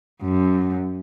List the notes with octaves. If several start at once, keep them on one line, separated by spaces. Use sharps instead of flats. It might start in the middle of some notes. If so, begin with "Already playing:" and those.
F#2